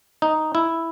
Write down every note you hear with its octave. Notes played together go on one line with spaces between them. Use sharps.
D#4
E4